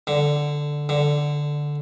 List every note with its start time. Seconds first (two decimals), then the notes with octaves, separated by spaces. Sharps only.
0.07 D3
0.89 D3